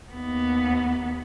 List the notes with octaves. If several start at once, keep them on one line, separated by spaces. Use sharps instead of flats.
D#2 B3